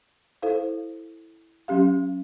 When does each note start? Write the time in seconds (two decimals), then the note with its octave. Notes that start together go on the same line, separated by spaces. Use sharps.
0.42 E4 A4 C5 F5
1.68 F#3 C#4 G4 F5